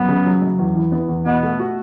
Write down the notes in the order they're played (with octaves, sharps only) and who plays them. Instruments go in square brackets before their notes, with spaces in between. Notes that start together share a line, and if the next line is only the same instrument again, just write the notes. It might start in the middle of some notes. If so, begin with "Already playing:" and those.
Already playing: [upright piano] F#2 [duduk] B3
[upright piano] C#3
F#3
F#2
E2
E3
B3
E2
[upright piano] B2 [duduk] B3
[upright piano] A3
F#4